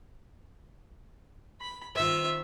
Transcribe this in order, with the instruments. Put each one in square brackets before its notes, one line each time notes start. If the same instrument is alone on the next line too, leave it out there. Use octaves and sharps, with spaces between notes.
[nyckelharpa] B5
[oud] D#3 C4 [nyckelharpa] F4 E5